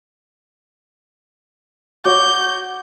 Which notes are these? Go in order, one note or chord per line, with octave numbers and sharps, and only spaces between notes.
F#4 C#5 D6 G6